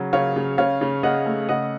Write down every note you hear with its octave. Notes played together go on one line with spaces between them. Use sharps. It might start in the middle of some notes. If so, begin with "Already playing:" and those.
Already playing: C#3 F#3
C#3 C#5 F5
C#3
C#3 C#5 F5
C#3
C#3 D#5 F#5
A3
C#3 D#5 F#5